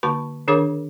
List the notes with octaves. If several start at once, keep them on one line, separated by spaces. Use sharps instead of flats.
D3 A#3 F#4 A5 B5 C#6
D#3 D4 G#4 A#4 C#5 D6